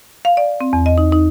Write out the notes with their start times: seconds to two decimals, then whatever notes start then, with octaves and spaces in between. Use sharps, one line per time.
0.25 F5
0.37 D5
0.61 C4
0.73 E2
0.86 D#5
0.98 D#4
1.12 D#4